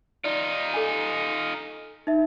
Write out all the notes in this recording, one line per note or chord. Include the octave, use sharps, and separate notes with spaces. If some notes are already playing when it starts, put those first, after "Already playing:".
D#4 F4 D5
A4 G#5
D#4 E5